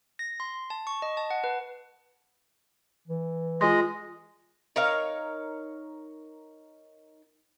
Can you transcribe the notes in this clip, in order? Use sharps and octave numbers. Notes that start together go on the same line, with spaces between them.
A#6
C6
A5
C#6
D#5
A5
F#5
B4
E3
G#3 F4 D#5 C6
D#4 A#4 C#5 F5